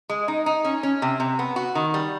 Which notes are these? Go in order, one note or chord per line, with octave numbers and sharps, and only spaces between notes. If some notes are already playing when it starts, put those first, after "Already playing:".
G#3
D#4
D#4
C#4
C#4
C3
C3
B3
F#4
D#3
G3